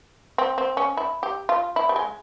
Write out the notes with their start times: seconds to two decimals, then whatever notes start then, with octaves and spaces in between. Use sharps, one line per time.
0.38 C4
0.58 C4
0.77 C#4
0.97 E4
1.23 G4
1.49 F4
1.76 E4
1.89 G3
1.96 G#3